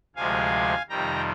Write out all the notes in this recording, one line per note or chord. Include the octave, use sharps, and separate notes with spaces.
D2 C3 F3 G#3 F5 G#5
F2 C3 D#3 G3 G5 A#5